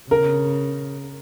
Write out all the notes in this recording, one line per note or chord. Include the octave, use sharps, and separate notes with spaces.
C#3 A#4